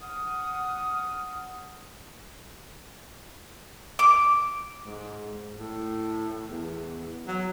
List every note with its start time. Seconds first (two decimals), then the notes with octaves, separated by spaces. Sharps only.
0.01 F#5 D#6 F6
3.99 D6
4.86 G#2
5.59 A2
6.49 E2
7.27 F#3